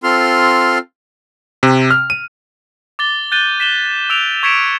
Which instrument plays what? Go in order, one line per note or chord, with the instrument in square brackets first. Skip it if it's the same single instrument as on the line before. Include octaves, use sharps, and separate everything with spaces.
[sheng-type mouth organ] C4 F4 A4 C6 F6
[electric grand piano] C3
F6
D#7
[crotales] D6 A6 G7
F#6 G6 A6 D#7 G7
B6 E7 G7
E6 D7 F7
C#6 G#6 B6 C#7 D7 E7